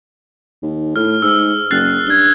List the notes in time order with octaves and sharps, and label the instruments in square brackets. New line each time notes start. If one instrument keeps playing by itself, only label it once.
[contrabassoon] D#2
[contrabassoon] A2 [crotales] F6
[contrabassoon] G#2 [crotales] E6
[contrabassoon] F#1 [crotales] F#6 A6 C7
[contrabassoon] G2 [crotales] G#6 G7